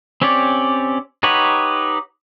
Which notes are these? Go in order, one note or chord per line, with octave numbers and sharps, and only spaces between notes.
C4 C#4 G4 C#5 D5
D#4 G4 B4 C#5 F#5